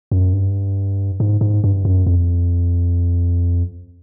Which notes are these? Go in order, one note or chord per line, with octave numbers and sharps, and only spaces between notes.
F#2
G2
G#2
G#2
G2
F#2
F2